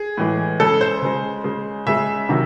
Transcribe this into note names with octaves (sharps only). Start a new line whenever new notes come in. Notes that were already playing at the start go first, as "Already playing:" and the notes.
Already playing: G#4
A2 E3 G#3
C#3 G#3 A4
C5
C#3 G#3
C#3 G#3
C#3 G#3 E5
C3 D#3 F#3